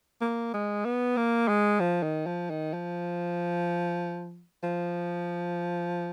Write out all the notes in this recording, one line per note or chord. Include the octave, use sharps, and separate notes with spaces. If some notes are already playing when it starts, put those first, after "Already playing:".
A#3
G#3
B3
A#3
G#3
F3
D#3
F3
D#3
F3
F3